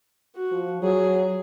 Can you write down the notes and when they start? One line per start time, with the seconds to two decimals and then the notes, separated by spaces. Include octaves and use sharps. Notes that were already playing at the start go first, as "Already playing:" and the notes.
0.36 F#4
0.51 F3
0.82 F#3 G#4